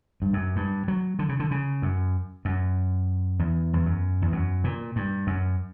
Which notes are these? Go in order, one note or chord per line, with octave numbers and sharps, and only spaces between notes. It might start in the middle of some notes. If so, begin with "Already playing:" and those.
G2
F#2
G2
F#3
D3
C#3
D3
C#3
F#2
F#2
E2
E2
F#2
E2
F#2
A#2
G2
F#2